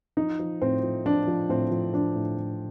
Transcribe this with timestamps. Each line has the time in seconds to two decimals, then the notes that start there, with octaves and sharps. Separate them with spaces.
0.17 F3 D#4
0.39 F3
0.62 A2 C4
0.83 F3
1.06 F3 D4
1.27 F3
1.49 A2 C4
1.71 F3
1.93 F3 D4
2.16 A2
2.37 A2